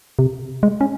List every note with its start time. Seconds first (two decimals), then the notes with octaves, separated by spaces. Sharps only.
0.19 C3
0.63 G#3
0.81 C#4